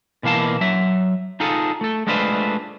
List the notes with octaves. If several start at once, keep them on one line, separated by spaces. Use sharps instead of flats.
B2 E3 A#3 F5 A5
F#3 E5
D#4 F4 G#4 A4
A3 A4
G#3 A3 D4 F4 B4 C5